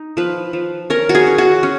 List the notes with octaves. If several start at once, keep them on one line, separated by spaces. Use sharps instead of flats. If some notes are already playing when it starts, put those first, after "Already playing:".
Already playing: D#4
F3 B4
F3
C#4 A#4
F#4
G#4
C#4
F#4
C#4